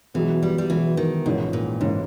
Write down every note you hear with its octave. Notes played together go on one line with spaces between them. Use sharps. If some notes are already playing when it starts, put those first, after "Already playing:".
B1 B2 E3 G#3 B3
G3
G3
B1 B2 E3 G#3 B3
D#3
A#1 G#2 B2 E3 A#3 C#4
A#2
G#2 E3 A#3 C#4